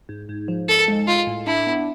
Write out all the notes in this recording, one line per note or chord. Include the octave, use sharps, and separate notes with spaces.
G#2
G#2
F3
G#2 A4
G#3
G#3 F4
A2
D4 E4
B3